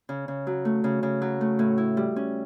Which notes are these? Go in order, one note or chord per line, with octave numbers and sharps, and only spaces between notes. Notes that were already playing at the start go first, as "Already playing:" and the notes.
C#3
C#3
F#3
A3
C#3
C#3
F#3
A3
A2
E4
G3
C#4